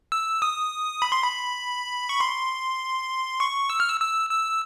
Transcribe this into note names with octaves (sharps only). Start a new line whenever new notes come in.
E6
D#6
B5
C6
B5
C#6
C6
C#6
E6
F6
E6
E6
E6